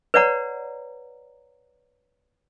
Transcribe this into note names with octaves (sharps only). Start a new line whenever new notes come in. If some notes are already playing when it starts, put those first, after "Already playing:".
B4 C#5 D5 F#5 A#5